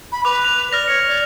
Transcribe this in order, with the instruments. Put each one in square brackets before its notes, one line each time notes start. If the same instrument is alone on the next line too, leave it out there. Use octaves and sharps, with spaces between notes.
[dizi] B5
[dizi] B4 [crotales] D6 F#6 F7
[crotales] F7
[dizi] D5 [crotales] F6 A#6 F7
[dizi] C#5 [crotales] C#7
[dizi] D5